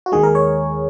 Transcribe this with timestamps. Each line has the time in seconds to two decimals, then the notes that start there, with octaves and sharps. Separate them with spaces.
0.06 F#4
0.12 D#2 D#3 G#3 G#4
0.23 A#4
0.35 C#5